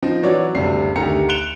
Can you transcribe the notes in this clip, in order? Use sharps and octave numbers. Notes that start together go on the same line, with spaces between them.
F3 C4 D#4
E3 F#3 F#4 C#5 D5
F#1 D2 C3 G3 C7
D2 D#3 G4 A#5 C#7
F#6 C#7 D7 E7 F7 G7